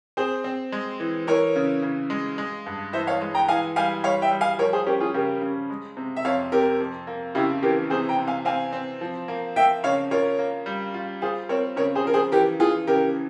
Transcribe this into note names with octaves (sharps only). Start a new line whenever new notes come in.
C4 G#4 C5
C4
G#3
E3
E3 A#4 C#5
C#3
C#3
G#3
G#3
G2
E3 C5 E5
C#5 F5
G#3
G5 A#5
E3 F5 G#5
G3 F5 G#5
G3 C#5 F5
E5 G5
G3
F5 G#5
F3 A#4 C#5
G#4 C5
C#4 G4 A#4
F4 G#4
C#3 G4 A#4
C#3
G#3
C3
E5
F2 C#5 F5
C3 G4 A#4
F2
A#3
C#3 E4 G4
E3 G4 A#4
C3 G#4 C5
G5 A#5
C3
F5 G#5
C4 F5 G#5
C4
F3
A#3
A#3 E5 G5
C#3 C#5 F5
F4 A#4 C#5
A#3
G3
F4
F4 G#4 C5
C4 A#4 C#5
C#3 A#4 C#5
G#4 C5
F3 A#4
G#4 C5
E3 G4 A#4
E3 F4 G#4
C#3 G4 A#4